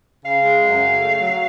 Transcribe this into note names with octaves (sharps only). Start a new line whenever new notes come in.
C#3 F5
G#3
F#2
C#3
A3
F#3